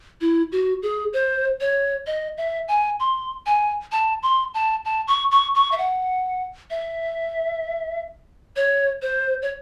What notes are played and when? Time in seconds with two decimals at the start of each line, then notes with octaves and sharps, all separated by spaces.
0.21 E4
0.52 F#4
0.83 G#4
1.13 C5
1.61 C#5
2.07 D#5
2.38 E5
2.68 G#5
3.00 C6
3.46 G#5
3.92 A5
4.23 C6
4.54 A5
4.85 A5
5.07 C#6
5.31 C#6
5.55 C#6
5.72 E5
5.78 F#5
6.70 E5
8.56 C#5
9.02 C5
9.42 C#5